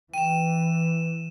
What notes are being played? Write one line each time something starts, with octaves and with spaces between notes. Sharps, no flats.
E3 G5 D#7 E7